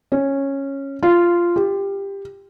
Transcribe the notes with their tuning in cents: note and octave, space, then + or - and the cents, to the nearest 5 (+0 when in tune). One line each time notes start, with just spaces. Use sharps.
C#4 -10
F4 -10
G4 +15